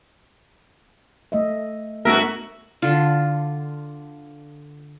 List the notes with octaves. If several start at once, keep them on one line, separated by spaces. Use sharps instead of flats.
A3 D#5 E5
G2 A3 B3 F#4 A#4 E5
D3 F4